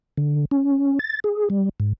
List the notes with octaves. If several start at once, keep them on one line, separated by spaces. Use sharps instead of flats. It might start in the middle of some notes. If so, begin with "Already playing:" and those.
D3
C#4
A6
G#4
G3
G#2